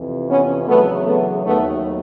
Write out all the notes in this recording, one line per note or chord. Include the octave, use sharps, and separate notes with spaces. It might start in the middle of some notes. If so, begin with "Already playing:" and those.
Already playing: F2 C3 E3
B3 C#4
E2 C#3 F#3 A3 B3
A3 B3
D#2 D#3 F#3 A3 B3